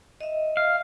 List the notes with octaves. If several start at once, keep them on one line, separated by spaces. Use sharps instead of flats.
D#5 E5
F5